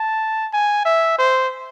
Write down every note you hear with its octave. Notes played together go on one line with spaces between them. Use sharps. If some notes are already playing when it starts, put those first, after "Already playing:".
Already playing: A5
G#5
E5
C5